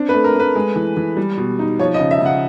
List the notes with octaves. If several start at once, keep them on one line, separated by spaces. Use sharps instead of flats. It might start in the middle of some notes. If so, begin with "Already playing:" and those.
Already playing: C4 D4
B4
A3
A#4
A3 B4
G#3
E3
E3
G3
B2
D#4
F3 C#5
D#5
C#3
E5
C#3 F#5